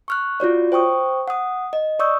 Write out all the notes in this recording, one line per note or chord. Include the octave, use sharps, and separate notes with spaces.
C#6 F6 F#6
F4 F#4 C#5 D5
C5 G5 C#6 D#6
F#5 D#6
D#5
D5 C#6 D#6 E6 G6